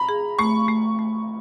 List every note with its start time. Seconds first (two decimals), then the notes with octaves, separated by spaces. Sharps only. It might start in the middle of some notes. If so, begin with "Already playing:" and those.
Already playing: A#5 B5
0.09 G#4
0.39 A3 C#6
0.68 A3
0.99 A3